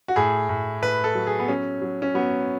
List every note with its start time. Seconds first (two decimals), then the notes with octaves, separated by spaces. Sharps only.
0.08 F#4
0.16 A2 G#4
0.49 A2
0.82 A2 B4
1.04 A4
1.15 F#3
1.27 G#4
1.40 B3
1.48 F#3 C#4
1.82 F#3
2.02 C#4
2.14 F#3 B3